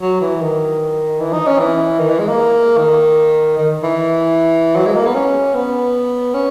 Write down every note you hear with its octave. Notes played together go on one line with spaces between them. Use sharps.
F#3
E3
D#3
E3
D#4
C#4
E3
D#3
E3
G#3
A#3
D#3
D#3
E3
F#3
G#3
A#3
B3
C#4
B3
C#4